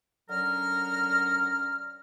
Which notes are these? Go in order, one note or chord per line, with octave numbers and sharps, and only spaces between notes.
D3 F#3 C#4 A#4 F6